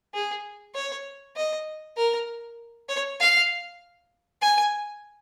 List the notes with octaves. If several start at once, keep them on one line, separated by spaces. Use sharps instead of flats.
G#4
C#5
D#5
A#4
C#5
F5
G#5